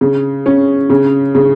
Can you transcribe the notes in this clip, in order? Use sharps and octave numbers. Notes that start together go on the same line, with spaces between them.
C#3
C#4
C#3
C#3